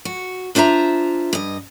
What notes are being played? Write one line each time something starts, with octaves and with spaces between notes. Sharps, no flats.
F#4
D4 F4 C5 E5 A#5
G2 D#5